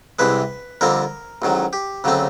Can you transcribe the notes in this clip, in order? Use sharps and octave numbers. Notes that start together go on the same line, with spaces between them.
C2 C3 E3 G#3 B4
F2 D3 G3 C4 A#4
A1 G#2 D#3 F#3
G4
D2 C#3 F#3 A3 C4